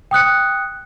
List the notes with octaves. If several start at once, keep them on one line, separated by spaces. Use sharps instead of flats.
G5 D#6 F#6 C#7